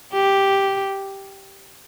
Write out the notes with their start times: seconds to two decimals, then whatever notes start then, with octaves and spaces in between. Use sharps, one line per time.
0.13 G4